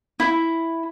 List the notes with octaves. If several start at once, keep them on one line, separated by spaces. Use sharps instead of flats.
E4